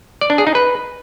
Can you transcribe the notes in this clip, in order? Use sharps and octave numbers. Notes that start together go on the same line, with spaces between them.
D5
D4
G#4
D#4
B4